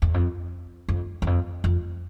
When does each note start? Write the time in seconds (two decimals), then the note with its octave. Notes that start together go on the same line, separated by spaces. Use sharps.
0.02 E2
0.14 F2
0.89 F2
1.22 E2
1.27 F2
1.64 F2